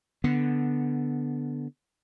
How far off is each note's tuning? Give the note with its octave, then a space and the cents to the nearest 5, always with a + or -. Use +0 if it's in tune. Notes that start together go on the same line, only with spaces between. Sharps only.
D3 +0 B3 -5